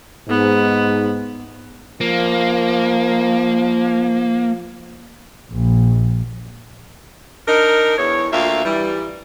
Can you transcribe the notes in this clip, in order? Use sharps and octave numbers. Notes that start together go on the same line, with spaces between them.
G#2 B3
F3 A#3
A#1
D4 D#4 A#4
E2 C#5
D2 A#3 F4 E5
E3 G3